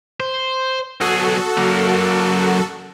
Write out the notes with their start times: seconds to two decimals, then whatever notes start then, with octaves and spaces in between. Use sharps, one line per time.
0.20 C5
1.00 B1 F#4 G#4 A4
1.58 F#2 A#3